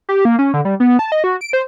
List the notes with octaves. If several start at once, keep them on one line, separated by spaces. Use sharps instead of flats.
G4
A#3
C#4
D3
G3
B3
A5
D#5
F#4
D7
C5